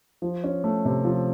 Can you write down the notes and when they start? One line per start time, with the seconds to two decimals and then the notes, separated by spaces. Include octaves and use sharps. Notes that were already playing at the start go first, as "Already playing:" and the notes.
0.22 F3
0.44 C#4
0.64 A3
0.85 C3
1.05 F3